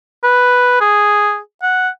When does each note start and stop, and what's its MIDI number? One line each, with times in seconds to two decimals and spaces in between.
0.23 0.77 71
0.80 1.38 68
1.62 1.89 78